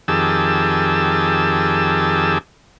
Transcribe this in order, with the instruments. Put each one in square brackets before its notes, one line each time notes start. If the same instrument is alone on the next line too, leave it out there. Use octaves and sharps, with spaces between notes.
[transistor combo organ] F2 D#3 G4 G#4 A5 E6